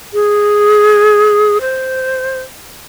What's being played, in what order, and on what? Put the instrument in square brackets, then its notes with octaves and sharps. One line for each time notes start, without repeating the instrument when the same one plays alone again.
[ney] G#4
C5